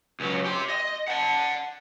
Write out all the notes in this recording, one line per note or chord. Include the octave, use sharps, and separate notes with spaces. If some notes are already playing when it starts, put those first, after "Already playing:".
C#2 F#3
G4 C6
D#5
F#5 A5